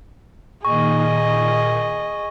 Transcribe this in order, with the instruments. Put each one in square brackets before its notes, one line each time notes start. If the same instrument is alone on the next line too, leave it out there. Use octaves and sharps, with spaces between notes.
[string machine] A#2 D#3 [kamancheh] G#4 D#5 [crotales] C#6